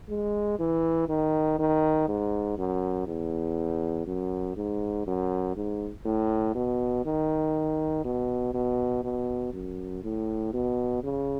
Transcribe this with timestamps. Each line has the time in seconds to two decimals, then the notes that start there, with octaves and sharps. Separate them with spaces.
0.09 G#3
0.59 E3
1.09 D#3
1.59 D#3
2.08 G#2
2.58 F#2
3.07 E2
4.07 F#2
4.56 G#2
5.07 F#2
5.56 G#2
6.05 A2
6.55 B2
7.05 D#3
8.04 B2
8.54 B2
9.03 B2
9.53 F#2
10.04 A2
10.53 B2
11.03 C#3